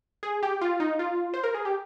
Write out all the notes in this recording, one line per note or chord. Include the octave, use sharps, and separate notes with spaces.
G#4
G4
F4
D#4
F4
C5
A#4
G#4
G4